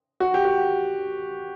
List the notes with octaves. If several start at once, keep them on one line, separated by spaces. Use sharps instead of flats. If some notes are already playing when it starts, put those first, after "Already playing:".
F#4
G4
F#4